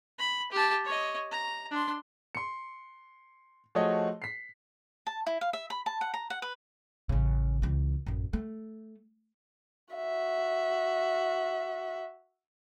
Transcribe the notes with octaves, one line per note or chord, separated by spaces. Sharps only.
B5
G4 A5
C#5 D#5
A#5
D4 C6
C6 C#7
F3 A3 F#4 G#4 C#5 D#5
B6 C7
A5
E4
F5
E5
B5
A5
F#5
A#5
F#5
B4
A1 C#3
C#2 E3
A1 F#2
A3
F#4 E5